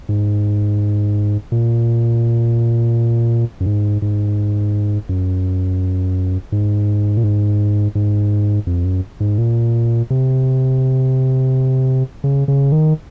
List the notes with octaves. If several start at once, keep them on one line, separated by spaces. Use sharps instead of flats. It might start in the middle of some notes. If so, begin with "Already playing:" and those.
G#2
A#2
F#2
G#2
G#2
F#2
G#2
A#2
G#2
G#2
F2
F#2
G#2
A#2
C3
C#3
C#3
D#3